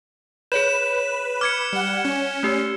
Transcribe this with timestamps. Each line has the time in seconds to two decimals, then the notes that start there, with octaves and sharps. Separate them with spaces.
0.52 G#4 B4 C#5 G6 E7
1.41 D6 F6 G#6 C#7
1.73 G3 F#5
2.05 C#4
2.43 A3 G4 E6